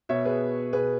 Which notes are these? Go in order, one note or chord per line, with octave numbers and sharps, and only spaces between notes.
B2 C#5 E5
G#4 B4
B2 G#4 B4